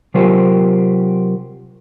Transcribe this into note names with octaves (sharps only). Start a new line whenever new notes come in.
C3 F#3 F4 G4 A#4 C5